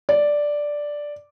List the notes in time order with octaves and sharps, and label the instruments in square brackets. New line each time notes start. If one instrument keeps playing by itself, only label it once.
[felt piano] D5